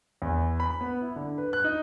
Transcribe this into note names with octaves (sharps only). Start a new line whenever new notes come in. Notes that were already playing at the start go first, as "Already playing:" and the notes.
E2
B5
B3
E4
D3
B4
F#6
D#4